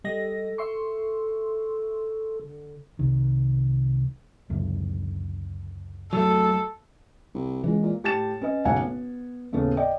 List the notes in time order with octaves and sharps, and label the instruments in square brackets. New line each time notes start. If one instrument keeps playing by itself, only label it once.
[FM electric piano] G3 D#5 A#6 [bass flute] A4
[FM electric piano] E5 C6 C#6
[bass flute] D3
[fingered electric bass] C2 D#3
C#2 F#2 D3
[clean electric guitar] F#3 A3 [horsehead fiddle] A4
[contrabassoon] C2
[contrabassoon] C#2 [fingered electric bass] E3 G#3
[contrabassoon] A#2
[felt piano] A2 G4 A5 A6 E7
C#4 B4 D#5
F#1 B1 A2 C#3 F#5 G#5
B3
D#2 A2 C#3 A3 B3
D5 D#5 G5